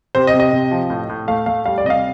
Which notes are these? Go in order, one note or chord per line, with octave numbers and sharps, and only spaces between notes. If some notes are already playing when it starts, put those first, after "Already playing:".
C3 C5
D#5
C3
D#5
C3
F3
A2
A2
A3 F5
A3 F5
G3 F5
D5
C3 D#5
F5